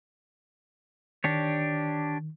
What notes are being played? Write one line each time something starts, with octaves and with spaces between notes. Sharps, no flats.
D#3 D4 G4 C#5